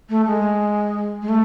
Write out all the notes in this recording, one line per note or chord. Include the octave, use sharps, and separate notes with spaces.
A3
G#3
G#3
A3